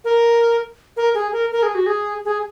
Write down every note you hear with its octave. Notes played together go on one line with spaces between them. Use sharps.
A#4
A#4
G#4
A#4
A#4
G#4
F#4
G#4
G#4